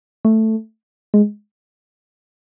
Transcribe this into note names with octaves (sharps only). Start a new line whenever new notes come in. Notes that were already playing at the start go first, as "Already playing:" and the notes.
A3
G#3